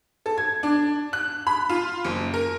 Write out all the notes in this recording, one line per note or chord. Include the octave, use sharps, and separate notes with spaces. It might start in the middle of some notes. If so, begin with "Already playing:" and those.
A4
G#6
D4
F#6
B5
F4
F#1
A#4